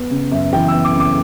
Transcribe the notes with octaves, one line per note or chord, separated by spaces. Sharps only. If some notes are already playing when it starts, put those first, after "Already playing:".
Already playing: B3
C#3
F#2 E5
E3 G5
E6
B3
D6
C#3
D6